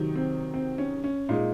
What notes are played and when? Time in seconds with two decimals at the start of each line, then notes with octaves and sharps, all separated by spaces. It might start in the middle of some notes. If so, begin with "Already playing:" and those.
Already playing: C3 D#3 F#3
0.16 C4
0.54 C4
0.78 C#4
1.04 C#4
1.29 A#2 G#3 D#4